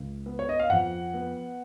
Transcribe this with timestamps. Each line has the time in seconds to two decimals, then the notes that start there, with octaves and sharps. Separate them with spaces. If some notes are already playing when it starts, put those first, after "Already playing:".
Already playing: C#2
0.26 B3
0.39 C#5
0.49 D#5
0.60 F5
0.70 F2 F#5
1.14 B3